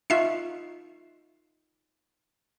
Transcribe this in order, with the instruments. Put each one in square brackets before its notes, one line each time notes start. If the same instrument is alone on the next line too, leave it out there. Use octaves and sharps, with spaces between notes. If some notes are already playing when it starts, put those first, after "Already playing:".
[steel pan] D#4 F4 C#6 [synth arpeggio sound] E5 C7